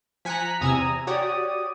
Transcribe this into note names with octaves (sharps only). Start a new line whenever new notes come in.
F3 G#5 A#5 F#6 B6 C#7
E2 C3 G#5 A#5 D#6 E6
F#4 G4 C#5 D5 D#6